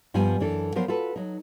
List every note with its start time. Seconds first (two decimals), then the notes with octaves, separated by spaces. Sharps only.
0.14 G2 F3 G3 B3 G#5
0.40 F#2 E3 D4 A4
0.75 F3 F#3 B3 A#4 C5
0.88 F4 F#4 A4 B4
1.16 F#3 D#4